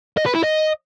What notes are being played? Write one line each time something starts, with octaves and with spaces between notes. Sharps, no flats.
D#5
B4
E4
D#5